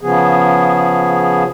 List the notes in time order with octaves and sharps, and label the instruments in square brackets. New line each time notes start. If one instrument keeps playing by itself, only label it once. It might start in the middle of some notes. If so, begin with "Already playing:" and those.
[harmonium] C#3 F3 B3 G#4